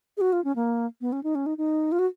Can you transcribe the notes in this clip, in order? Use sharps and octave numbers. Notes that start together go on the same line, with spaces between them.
G#4
F#4
F4
C#4
A#3
B3
C#4
D#4
C#4
D#4
D#4
F4
F#4